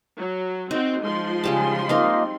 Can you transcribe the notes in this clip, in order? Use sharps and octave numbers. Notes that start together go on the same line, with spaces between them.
F#3
C4 D#4 F#4
F3 G#3 C6
C#3 G3 G#4 A5
A#3 C4 D#4 D#5 F5